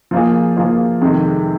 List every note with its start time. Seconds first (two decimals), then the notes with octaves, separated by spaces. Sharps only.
0.11 F3 A#3 F4 G#4
0.57 F3 A#3 F4 G#4
1.01 F2 C3 D#3 G#3